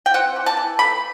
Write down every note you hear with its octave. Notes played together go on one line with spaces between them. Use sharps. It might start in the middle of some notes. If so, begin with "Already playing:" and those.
G5
C4 F#5
E3
A5
E3
A3 B5